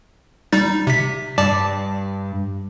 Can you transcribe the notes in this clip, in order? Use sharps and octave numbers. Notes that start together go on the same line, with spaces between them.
G3 D#4 A6
C3 B6
G2 D5 A5 D6